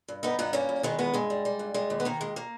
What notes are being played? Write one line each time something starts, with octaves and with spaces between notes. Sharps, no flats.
G2
D#3 B3 D#4
G2 B3 D#4
G3 A#3 C#4
E2
D#3 G#3 B3
E2 G#3 B3
G2 G#3
G3
G3
G2
G3 G#3
D#2
B3
D#3 A#3
D#2 G#3
A#3